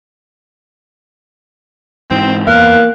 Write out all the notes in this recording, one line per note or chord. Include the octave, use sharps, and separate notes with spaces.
G#2 E3 C4
E2 A#3 A#4 F5 F#6